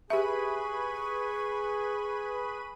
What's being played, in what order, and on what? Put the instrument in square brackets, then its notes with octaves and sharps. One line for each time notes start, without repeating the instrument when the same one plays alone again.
[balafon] G4 E5 [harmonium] G#4 [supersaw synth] B4 B5 D#7 [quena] C#6